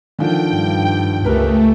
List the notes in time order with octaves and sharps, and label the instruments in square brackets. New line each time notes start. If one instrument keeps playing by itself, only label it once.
[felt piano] D3 D#3 F3 [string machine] G5
[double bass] G2
[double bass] C#2 [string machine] A3 [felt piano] G4 A#4 B4